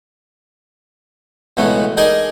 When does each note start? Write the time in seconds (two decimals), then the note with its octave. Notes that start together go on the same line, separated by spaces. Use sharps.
1.57 C#2 B2 E3 A3 B3
1.97 D4 D#4 G#4 A#4 D#5 G#5